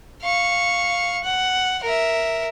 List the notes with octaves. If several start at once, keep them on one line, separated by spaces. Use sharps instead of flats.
F5 C#6
F#5
A#4 E5